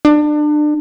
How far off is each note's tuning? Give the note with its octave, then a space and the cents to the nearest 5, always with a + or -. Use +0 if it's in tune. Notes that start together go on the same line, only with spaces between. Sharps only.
D4 +30